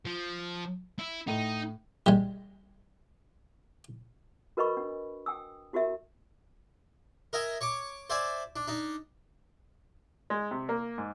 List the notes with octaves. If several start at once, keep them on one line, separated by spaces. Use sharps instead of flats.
F3
E4
A2 D#4 D#7
G3 G#3
F#4 A#4 B4 D#5 B5 C#6
D4
G5 G#5 D#6 E6
E4 F#4 G4 A#4 E5
A#4 D#5 E5 G#5
C#5 C#6 D6
C5 D5 E5 G#5
D4
D4 D#4
G#3
C3
A#3
G#2